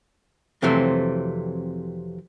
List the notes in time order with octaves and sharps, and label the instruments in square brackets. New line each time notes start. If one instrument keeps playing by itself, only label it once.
[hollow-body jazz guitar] F2 C3 E3 F#3 A3 C4